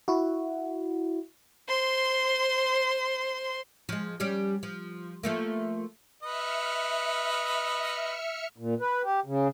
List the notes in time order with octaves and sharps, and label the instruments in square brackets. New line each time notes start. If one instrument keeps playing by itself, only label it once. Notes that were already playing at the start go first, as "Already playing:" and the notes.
[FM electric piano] E4 F#4
[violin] C5 C6
[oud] F3 G#3
G3 C#4 G4
F3
F3 A3 A#3
[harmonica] B4 D#5 [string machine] E5 F6 C#7
[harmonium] A#2
B4
G4
C#3